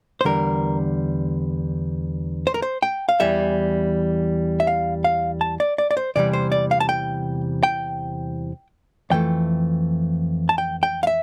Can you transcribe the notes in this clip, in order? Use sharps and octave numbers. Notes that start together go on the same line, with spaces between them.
C5
E2 D3 G3 A#4
C5
A#4
C5
G5
F5
E2 E3 G3 E5
E5
F5
F5
A5
D5
D5
D5
C5
E2 C3 E3 G3 D5
C5
D5
F5
A5
G5
G5
F2 E3 A3 G5
A5
G5
G5
F5
E5